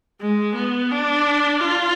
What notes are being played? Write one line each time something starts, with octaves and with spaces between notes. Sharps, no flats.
G#3
B3
D4
F4